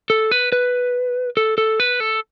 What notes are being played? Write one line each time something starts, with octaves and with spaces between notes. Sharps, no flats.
A4
B4
B4
A4
A4
B4
A4